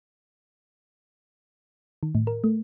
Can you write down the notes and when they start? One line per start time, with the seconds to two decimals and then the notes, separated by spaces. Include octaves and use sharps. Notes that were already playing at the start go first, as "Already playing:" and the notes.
2.03 D#3
2.15 A2
2.27 A#4
2.44 A3